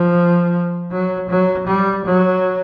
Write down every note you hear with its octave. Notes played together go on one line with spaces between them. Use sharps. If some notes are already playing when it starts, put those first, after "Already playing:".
Already playing: F3
F#3
F#3
G3
F#3